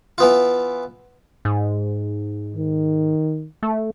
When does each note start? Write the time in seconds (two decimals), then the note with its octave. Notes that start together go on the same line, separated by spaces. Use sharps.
0.18 E3 B3 F4
1.45 G#2
2.56 D#3
3.63 A3